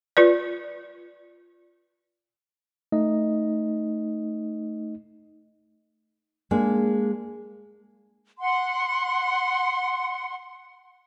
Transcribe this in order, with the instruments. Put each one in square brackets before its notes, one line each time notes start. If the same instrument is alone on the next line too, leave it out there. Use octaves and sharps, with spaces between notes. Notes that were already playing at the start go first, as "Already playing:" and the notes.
[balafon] F4 B4 D5
[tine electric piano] A3 D#4 D#5
[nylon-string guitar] G#3 A#3 D4 G#4
[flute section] F#5 C6